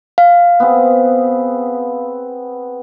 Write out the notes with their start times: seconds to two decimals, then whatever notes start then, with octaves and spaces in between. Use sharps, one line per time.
0.18 F5
0.60 B3 C4 G#4